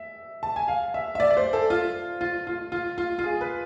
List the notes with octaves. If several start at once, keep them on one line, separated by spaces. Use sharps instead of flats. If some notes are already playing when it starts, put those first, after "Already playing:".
Already playing: E5
A5
G#5
F5
E5
E5
D5
D5
C5
A4
F4
F4
F4
F4
F4
F4
G#4
B4